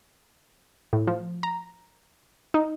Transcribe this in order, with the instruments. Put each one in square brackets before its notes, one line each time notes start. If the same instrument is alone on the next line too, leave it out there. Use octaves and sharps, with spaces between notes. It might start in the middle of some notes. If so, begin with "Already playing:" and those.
[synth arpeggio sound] A2
F3
A#5
D#4